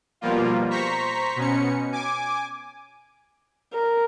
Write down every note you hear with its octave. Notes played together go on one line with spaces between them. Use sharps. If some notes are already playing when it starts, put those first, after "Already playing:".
B2 F3 G3 A#3 F4
C5 A#5 C#6 B6
B2 C#4 C#7
G#5 D6
A#4